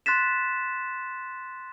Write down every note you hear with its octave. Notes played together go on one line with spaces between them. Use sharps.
C6 F#6 A6 B6 E7